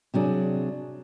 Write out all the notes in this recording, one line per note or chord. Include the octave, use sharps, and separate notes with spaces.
C3 F#3 D4 G#4